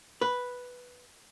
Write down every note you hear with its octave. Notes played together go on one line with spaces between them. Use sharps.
B4